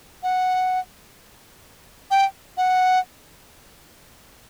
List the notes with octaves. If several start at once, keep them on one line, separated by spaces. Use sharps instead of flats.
F#5
G5
F#5